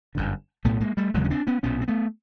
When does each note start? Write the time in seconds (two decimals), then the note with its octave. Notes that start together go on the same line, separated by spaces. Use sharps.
0.15 G1 F#2 D3
0.64 B1 A2 A3 B3
0.80 G#3 A#3
0.97 G3 A3
1.14 E1 D#2 C#3 F#3 G#3
1.24 C#4
1.30 C4 D4
1.47 B3 C#4
1.63 B1 A#2 B3 C#4
1.81 C4
1.88 A3 B3